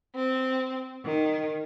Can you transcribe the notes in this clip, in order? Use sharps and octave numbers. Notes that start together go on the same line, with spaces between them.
C4
D#3